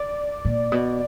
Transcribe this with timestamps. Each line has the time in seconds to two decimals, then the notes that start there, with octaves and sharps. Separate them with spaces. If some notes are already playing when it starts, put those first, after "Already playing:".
Already playing: D5
0.45 A#2
0.72 B2